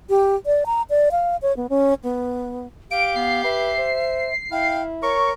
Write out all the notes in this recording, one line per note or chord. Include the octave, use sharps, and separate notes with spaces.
G4
D5
A#5
D5
F5
C#5
B3
C#4
B3
G4 F5 D7
B3 C7
B4 E5
C5
E4 F5 G5
A#4 C#5 C#6